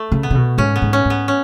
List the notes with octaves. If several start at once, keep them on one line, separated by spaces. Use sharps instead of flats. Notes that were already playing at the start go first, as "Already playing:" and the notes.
Already playing: A3
C#3
B3
C#3
B2
G#2 C#4
B3
G#2
C#4
G#2
B3
C#4